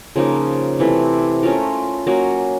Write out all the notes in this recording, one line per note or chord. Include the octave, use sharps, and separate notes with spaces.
C#3 F3 A#3 D#4
C3 E3 A3
A3 C#4 F4 A#4
F#3 A#3 C#4 F#4